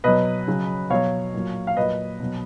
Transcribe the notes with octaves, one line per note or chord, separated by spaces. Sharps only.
B2 F#3 B4 D#5
C#3 F#3
B2 F#3 C#5 F5
A#2 F#3
F5
A#2 F#3 B4 D#5
B2 F#3